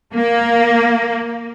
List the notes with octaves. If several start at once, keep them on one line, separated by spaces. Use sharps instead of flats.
A#3